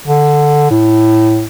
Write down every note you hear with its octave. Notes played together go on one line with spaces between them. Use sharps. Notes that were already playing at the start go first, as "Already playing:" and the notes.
D3
A2